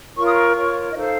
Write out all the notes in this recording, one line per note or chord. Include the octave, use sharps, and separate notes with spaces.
F4 A#4 C#5 C#6
D#6
C#6
F4 A#4 C#5
D#5
D#4 A4 C5 F5